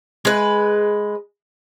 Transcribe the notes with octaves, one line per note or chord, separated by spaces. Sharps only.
G#3 B4